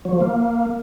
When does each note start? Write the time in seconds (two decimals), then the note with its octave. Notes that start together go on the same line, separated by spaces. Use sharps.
0.05 F#3
0.13 F3
0.20 A#3